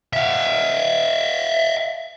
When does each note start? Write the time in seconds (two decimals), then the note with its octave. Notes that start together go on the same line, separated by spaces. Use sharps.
0.13 E5 F5